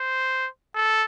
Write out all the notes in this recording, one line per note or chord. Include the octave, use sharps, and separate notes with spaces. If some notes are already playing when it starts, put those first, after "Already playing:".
Already playing: C5
A4